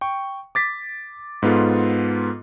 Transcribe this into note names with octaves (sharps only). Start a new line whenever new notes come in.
G5 C#6
D6 A6 B6
G#2 B3 F4 A4